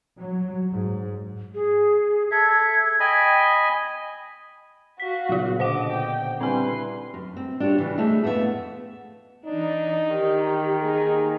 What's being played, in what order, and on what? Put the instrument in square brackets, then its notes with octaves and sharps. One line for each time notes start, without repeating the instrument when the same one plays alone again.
[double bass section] F#3
G#2
[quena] G#4
[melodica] A4 E5 [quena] G#6
[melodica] D#5 G#5 B5 [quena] G5
[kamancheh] F#4 F5 [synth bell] B6
[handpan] A#2 C#3 B3 [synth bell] F#3 F4
[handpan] B2 D3 [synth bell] C5 F#5 [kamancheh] D#5 D6
[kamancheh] G5
[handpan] G3 D4 E4 [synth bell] C4 G#5 [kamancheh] B4 C6
[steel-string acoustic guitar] F#2
C4
D4 F4 G4 G#4 C#5
C#3 E3
G#3 A3 C#4 E4 G#4
F2 A3 B3 C4 E5 F5
[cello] E3 D4 [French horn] D#4
[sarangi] D#3 [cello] G4
[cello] A#3 D#4 [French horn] G#4